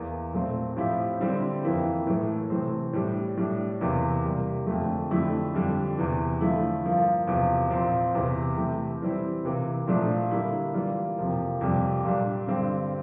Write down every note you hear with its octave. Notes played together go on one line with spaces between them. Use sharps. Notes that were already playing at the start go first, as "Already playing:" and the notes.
Already playing: E2 E3 A#3
A#2 A3 C4 F4
A2 F3 C4 E4 G4
D3 G3 C4 E4 G4
F2 E3 A#3 E4
A2 E3 A3
C3 E3 A3 C4
A2 G3 D4 G4
A2 G3 D4
E2 C3 E3 A#3
C3 G3 A#3
F2 D3 A3
F2 D3 A3 E4 G4
F2 D3 G3 D4
E2 C3 E3
D3 F3 A3 E4
G2 F3 A#3 F4
E2 C3 F3
A#2 F3 C4
E2 C3 E3
C3 E3 A3 E4 G4
E3 G3 C4 E4
C3 E3 A#3
A#2 F3 A3 D4
D3 G3 A#3 E4 G4
E3 G3 A#3 F4
F2 C3 F3 A#3
F2 C3 G3
A#2 G3 D4
G2 D3 G3 C4 G4